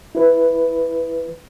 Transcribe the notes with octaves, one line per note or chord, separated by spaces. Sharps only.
E4 B4